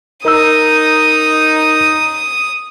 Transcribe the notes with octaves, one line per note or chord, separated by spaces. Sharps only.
D#4 A#4 D#6 E6